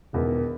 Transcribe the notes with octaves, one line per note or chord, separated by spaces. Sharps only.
E1 E2 D#3